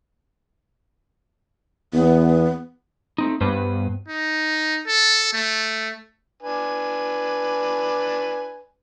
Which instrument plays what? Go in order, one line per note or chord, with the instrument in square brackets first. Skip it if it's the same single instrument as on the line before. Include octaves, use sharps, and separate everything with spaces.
[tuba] E2 [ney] B3
[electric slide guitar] A3 C4 D#4
[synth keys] G2 [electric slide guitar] B3 B4 C5
[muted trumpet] D#4
A4
A3
[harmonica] D4 B4 G#5